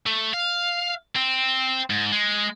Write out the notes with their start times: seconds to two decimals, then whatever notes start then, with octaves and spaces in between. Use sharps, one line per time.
0.06 A3
0.34 F5
1.15 C4
1.90 G#2
2.12 G#3